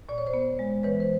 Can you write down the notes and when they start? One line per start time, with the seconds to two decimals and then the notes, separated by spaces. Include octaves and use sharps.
0.09 A#2 D5
0.18 C#5
0.26 C5 D5
0.34 B3
0.59 G#3
0.83 E3 B4 C#5
1.00 C5